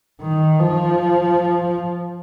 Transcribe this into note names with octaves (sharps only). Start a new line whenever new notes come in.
D#3
F3